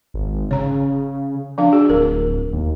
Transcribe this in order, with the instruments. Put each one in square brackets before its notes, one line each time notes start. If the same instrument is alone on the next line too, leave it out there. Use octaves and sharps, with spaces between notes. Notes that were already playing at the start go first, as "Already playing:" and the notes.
[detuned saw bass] G#1
[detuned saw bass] C#3 [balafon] C#5 A#5
[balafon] F3 D4 F5
F#4 G#4
[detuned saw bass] D1 [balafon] A#4
[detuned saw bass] D#2